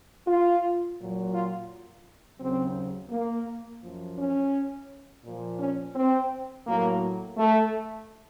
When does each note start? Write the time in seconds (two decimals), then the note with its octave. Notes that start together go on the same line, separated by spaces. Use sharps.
0.27 F4
0.98 A#2 F#3
1.33 F4
2.39 D#2 C#3 F#3 C4
3.10 A#3
3.82 F#2 F3
4.17 C#4
5.24 A#2 F3
5.59 C#4
5.95 C4
6.66 A2 F#3 A#3
7.37 A3